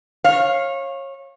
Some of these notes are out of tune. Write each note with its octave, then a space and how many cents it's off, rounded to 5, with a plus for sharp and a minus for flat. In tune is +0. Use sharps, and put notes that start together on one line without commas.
C#5 -25 F5 +0